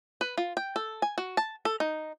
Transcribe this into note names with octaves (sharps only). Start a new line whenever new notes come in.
B4
F4
G5
A4
G#5
F#4
A5
A4
D#4